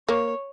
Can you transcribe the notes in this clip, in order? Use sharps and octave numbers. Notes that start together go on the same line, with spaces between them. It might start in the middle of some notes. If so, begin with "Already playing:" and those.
A#3 C#5